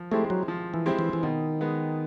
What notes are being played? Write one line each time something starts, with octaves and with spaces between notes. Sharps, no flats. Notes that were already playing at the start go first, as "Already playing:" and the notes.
Already playing: F3
G#3 A3 C4 E4 G4
F#3
F3
E3
G#3 C4 E4 G4
E3
E3
B2 D#3
G#3 B3